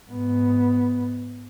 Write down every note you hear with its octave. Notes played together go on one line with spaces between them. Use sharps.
G#2 B3